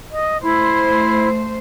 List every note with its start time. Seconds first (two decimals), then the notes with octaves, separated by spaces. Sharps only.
0.11 D#5
0.43 A3 E4 C5